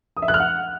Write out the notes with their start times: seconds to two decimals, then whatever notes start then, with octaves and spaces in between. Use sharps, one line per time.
0.17 D#6
0.22 E5
0.28 F#6
0.34 F6
0.40 F#5